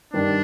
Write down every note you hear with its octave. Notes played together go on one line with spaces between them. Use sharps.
G2 D#3 G3 D4